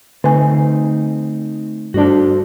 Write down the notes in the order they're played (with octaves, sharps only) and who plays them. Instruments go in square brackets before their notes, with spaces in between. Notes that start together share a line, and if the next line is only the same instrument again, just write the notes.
[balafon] D3 G#5 [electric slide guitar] A3 C4 D#4
[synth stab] G2 D4 [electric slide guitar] F#4 A4 C5